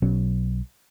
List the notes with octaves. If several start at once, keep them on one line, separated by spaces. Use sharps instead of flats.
B1 B2 F#3 C#4